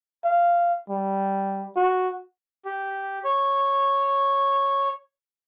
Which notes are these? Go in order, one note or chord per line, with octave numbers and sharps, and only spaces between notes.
F5
G3
F#4
G4
C#5